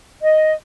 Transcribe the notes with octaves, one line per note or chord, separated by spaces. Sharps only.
D#5